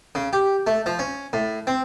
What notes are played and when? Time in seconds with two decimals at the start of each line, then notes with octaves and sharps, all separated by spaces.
0.15 C#3
0.33 G4
0.67 A3
0.86 F3
0.99 C#4
1.33 A2
1.67 C4